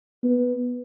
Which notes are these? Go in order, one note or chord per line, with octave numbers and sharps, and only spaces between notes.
B3